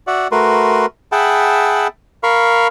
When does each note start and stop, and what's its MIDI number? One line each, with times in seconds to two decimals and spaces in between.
0.07 0.28 66
0.07 0.28 74
0.07 0.28 76
0.07 0.28 78
0.31 0.86 57
0.31 0.86 66
0.31 0.86 70
0.31 0.86 71
0.31 0.86 84
1.12 1.88 68
1.12 1.88 76
1.12 1.88 78
1.12 1.88 79
1.12 1.88 81
1.12 1.88 83
2.23 2.68 70
2.23 2.68 77
2.23 2.68 83
2.23 2.68 85